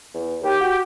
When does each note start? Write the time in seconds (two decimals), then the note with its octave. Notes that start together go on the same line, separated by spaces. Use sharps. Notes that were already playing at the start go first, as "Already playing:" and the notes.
0.14 E2
0.42 D#2 G4
0.60 F#4